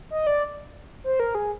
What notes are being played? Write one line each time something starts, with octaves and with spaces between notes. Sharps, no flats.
D#5
D5
C5
A#4
G#4